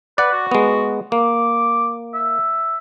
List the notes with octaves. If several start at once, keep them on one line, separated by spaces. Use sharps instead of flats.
B4 D5 F#5
F#4
G#3 B3
A#3 D6
E5